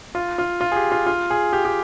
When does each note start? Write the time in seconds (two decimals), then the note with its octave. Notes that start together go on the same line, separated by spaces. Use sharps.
0.15 F4
0.38 F4
0.61 F4
0.72 G#4
0.76 G4
0.92 F4
1.07 F4
1.30 G#4
1.53 G4
1.65 G4